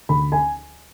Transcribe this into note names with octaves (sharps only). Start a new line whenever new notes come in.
D2 B5
G#5